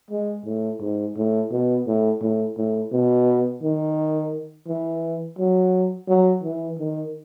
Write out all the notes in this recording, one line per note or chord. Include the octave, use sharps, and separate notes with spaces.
G#3
A2
G#2
A2
B2
A2
A2
A2
B2
D#3
E3
F#3
F#3
E3
D#3